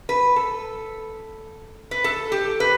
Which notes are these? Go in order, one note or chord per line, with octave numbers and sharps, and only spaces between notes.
B4
A4
B4
A4
G4
B4